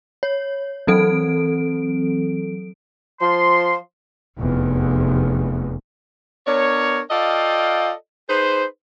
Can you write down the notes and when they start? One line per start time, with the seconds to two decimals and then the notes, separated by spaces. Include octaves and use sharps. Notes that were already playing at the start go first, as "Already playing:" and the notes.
0.23 C#5
0.87 E3 F#3 C4 A4 D7
3.21 F3 C6
4.39 F1 E2
6.47 B3 D4 A#4 C#5
7.11 F4 A4 D5 D#5 F5 G5
8.30 D#4 G#4 B4 C5